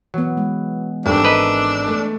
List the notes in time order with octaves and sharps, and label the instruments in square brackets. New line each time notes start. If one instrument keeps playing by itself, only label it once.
[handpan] E3 B3 [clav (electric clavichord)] F#3
[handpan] G#3
[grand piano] G#1 [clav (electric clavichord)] G2 [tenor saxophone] D4 [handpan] G#4 A4 E5
[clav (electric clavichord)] A#4 B4 D#5
[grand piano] A3